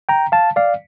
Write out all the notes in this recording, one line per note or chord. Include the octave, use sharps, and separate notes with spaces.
G5 A#5
F5 A5
D5 F5